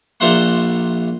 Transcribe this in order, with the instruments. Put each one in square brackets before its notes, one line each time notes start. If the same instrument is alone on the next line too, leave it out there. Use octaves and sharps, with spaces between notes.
[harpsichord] A#1 A#2 C5 E5 F#5 C6